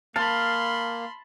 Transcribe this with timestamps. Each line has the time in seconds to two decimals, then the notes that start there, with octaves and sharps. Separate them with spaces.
0.16 A#3 F5 A5 B5 C6